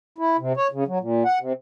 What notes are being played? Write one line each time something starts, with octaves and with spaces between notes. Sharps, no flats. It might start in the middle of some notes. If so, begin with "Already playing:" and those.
E4
C3
C#5
C#3
F#3
A#2
F#5
C3